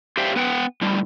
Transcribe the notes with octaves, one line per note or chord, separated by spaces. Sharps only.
G4 C5 D5 E5 F5 G5
B3 B4 F#5 G5
A2 D3 G3